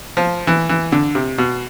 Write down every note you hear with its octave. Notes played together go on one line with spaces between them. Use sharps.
F3
E3
E3
D3
C3
B2